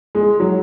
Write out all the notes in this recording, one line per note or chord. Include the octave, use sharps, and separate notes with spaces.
G#3
F#3